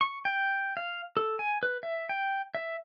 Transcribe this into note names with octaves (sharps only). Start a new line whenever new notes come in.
C#6
G5
F5
A4
G#5
B4
E5
G5
E5